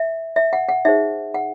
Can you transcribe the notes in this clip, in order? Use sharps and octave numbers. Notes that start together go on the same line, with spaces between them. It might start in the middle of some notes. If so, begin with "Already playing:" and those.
Already playing: E5
E5
F#5
F#5
D#4 G#4 C5 E5
F#5